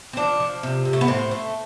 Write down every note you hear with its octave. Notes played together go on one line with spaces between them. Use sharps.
C4
F3 D4
F3
C3
C3
A3
B3
A2 C4
A3